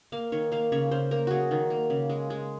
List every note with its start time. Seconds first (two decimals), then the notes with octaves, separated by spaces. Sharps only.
0.12 A#3 F5
0.32 D#3 C#5
0.52 A#3 F5
0.72 C#3 C#5
0.91 C#3 C5
1.11 A#3 A#4
1.27 F#3 F#4 G#4
1.51 D#3
1.70 A#3
1.90 C#3
2.10 G#3
2.30 G#3